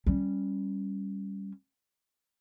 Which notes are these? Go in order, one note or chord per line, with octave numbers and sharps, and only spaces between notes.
G3 C#4